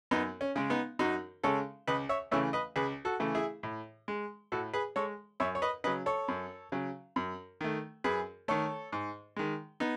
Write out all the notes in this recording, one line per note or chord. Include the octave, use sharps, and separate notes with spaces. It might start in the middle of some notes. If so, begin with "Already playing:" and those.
F#2 B3 D#4
C#4
C#3 G#3
B3 D#4
F#2 D#4 F#4
C#3 G#3 A4 C#5
C#2 B4 D#5
C#5 E5
C#3 E3 A3 C#5 E5
B4 D#5
C#2 G#4 B4
F#4 A4
C#3 E3 A3
E4 G#4
A2
G#3
A2 F#4 A4
G#4 B4
G#3 A4 C#5
F#2 C#5 E5
C#5
B4 D#5
C#3 F#3 B4 D#5
A4 C#5
F#2
C#3 F#3
F#2
D#3 A3
F#2 G#4 B4
D#3 A3 A4 C#5
G#2
D#3 G#3
B3 D#4